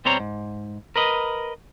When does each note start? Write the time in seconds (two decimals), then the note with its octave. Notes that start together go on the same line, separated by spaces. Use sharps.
0.05 B2 G3 C4 C5 C#5 A#5
0.20 G#2
0.96 A#4 B4 D#5